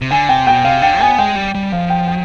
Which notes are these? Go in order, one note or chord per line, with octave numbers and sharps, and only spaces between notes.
C3
D3 G#5
C3 G5
B2 G5
C3 F5
D3 G5
B3 G#5
G#3 G5
G3
G3
F3 F5
G5
G5